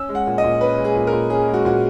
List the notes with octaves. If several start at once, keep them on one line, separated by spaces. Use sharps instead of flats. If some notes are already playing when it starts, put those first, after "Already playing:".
Already playing: C#4 E6
G#3
F#5
A#2
D#5
A#2
C#4 B4
G#3
G#4
A#2
A#4
A#2
C#4 G#4
G#3
F#4
A#2 F#4